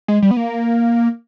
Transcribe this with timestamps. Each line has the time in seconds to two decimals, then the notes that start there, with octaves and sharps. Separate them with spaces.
0.08 G#3
0.22 G3
0.31 B3
0.37 A#3